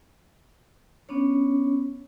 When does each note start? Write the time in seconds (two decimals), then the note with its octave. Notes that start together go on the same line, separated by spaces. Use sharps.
1.09 B3 C#4 D4 C#5